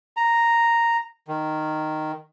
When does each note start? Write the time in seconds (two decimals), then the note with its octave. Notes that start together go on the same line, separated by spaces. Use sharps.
0.17 A#5
1.28 D#3